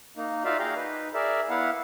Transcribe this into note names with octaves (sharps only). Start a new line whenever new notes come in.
A#3 D#4
D#4 F4 F#4 D5 E5 F5
F#4 G#4 F5 G5 A#5
D#4 B4
G#4 A#4 D5 E5
B3 E4 F5 F#5